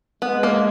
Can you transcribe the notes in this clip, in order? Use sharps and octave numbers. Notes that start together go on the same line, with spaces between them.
G#3 B3
A#3